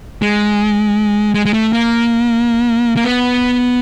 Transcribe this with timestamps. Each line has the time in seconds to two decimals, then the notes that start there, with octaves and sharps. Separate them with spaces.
0.22 G#3
1.34 G#3
1.45 G#3
1.54 A3
1.73 A#3
2.96 A#3
3.05 B3